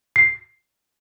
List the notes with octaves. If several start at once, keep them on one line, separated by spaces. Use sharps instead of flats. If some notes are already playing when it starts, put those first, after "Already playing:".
C7